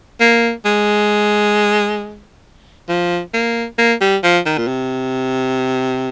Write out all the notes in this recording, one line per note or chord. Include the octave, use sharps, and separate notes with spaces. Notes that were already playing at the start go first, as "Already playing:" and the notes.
A#3
G#3
F3
A#3
A#3
G3
F3
D#3
A#2
C3